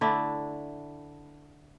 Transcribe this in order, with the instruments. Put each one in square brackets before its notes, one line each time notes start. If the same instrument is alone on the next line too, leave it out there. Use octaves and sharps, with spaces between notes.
[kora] D3 A3 D4 E4